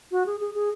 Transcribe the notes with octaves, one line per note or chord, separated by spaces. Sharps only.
F#4
G#4
G#4
G#4